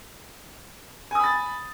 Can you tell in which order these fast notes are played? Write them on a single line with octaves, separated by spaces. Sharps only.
G#5 D#6 B5 A6